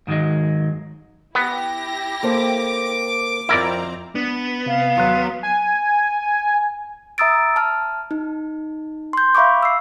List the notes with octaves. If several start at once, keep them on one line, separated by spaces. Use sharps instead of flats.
G#2 D#3 E3 F#3 G#3
B3 E4 G4 A#6
A#3 A4 C5 D6
F2 C4 E4 A#4 D5 A#5
B3 D4
C3 F5
D#2 F#3 C6 F#6
G#5
E5 A#5 D#6 E6 A6 D7
A5 F6
D#4
C6 G6
E5 F5 B5 C#6 D6
E6 C7